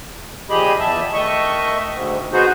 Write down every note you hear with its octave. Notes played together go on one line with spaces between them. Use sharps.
A#2 F3 G4 G#4 D#5 B5
E2 E5 A5
D#3 A3 D#5 E5 C#6
D2 G#2
B3 D#4 F#4 G#4 C5